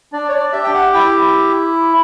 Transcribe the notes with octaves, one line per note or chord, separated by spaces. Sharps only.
D4 D5
C#5
D5
D5
G4 E5
G5
F#5
E4 G5